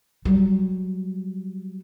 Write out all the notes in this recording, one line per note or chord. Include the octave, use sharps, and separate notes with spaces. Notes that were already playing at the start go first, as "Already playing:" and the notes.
F#3 G3